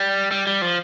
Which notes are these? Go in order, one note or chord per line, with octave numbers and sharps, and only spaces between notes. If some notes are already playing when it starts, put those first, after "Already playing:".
Already playing: G3
G3
G3
F3